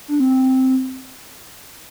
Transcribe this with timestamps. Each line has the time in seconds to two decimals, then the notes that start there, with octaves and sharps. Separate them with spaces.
0.08 D4
0.20 C4